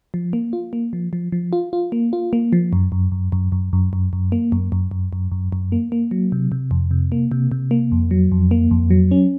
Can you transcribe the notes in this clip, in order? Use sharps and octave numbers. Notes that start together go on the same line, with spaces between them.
F3
A#3
F4
A#3
F3
F3
F3
F4
F4
A#3
F4
A#3
F3
F#2
F#2
F#2
F#2
F#2
F#2
F#2
F#2
A#3
F#2
F#2
F#2
F#2
F#2
F#2
A#3
A#3
F#3
C3
C3
F2
C3
A#3
C3
C3
A#3
F2
F#3
F2
A#3
F2
F#3
C#4